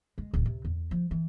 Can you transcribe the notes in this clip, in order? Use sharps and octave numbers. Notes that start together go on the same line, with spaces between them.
G#3
D1
C3
E2
F3
E3